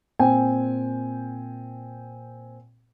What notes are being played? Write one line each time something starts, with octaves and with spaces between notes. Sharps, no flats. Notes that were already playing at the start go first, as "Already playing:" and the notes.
A#2 C4 G5 G#5